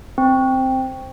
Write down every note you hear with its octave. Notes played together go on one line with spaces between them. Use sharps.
C4